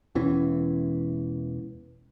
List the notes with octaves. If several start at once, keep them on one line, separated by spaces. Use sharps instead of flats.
E1 E2 E3 C#4